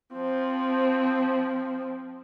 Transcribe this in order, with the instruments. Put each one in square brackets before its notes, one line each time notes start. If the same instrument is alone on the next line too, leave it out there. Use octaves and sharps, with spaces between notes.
[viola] F3 C4